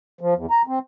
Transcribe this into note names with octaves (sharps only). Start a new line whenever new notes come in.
F3
E2
A#5
C4